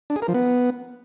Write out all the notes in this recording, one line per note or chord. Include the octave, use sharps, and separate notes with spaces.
D4
G#4
A#4
F3
B3